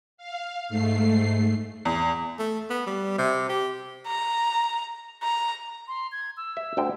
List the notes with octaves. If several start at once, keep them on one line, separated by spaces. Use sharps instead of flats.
F5
G#2 A3 C7
E2
A3
B3
G3
C3
G4
A#5
A#5
C6
G#6
E6
E5
D2 D3 G5